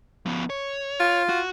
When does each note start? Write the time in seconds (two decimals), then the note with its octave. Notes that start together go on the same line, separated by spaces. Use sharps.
0.26 F3 B3
0.50 C#5
1.00 F4
1.29 F#4